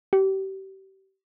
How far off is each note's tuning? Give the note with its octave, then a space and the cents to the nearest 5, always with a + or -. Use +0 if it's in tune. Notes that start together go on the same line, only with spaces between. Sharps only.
G4 -30